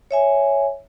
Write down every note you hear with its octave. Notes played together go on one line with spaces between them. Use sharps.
C#5 E5 G#5